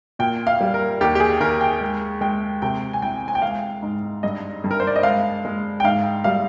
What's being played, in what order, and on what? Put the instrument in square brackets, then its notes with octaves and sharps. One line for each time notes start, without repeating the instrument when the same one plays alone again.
[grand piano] A#2 G5
F5
G3
A#4
D#2 G4
G4
G#4
D#2 A#4
G5
G#3
G#3 G5
C3 G5
G#5
C2 G5
G#5
G5
G#3 F5
G#2
G2 D#5
G2
A#4
C5
D5
D#5
G#3 F5
G#3
G5
G#2 F5
G3 F5